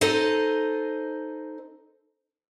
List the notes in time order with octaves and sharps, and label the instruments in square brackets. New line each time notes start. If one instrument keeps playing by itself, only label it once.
[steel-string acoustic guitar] D#4 A4 C5 D#5